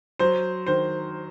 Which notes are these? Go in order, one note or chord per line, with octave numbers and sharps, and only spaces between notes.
F#3 C5
D#3 C5